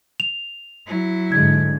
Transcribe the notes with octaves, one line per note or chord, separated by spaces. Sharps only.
F7
F#3 E4
G#2 D3 G#3 G#6